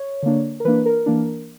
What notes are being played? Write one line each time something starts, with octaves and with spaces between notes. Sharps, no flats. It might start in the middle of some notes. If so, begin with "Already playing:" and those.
Already playing: C#5
D3 A#3 D4
A#4
E3 A#3 D4 B4
A#4
E3 A#3 D4